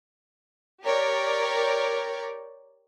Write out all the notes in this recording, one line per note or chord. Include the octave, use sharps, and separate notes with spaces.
G4 A#4 C#5 D5